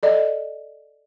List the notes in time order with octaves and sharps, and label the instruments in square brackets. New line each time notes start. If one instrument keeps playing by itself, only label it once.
[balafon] A4 D5 D#5